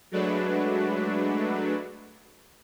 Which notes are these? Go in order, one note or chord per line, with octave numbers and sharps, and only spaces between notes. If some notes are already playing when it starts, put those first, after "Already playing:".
F#3 G#3 A3 D4 F#4 B4